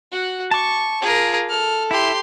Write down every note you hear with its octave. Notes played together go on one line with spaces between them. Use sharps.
F#4 F#5
A5 C#6 D6
F4 G#4 A#4
A4 F6
E4 G4 C6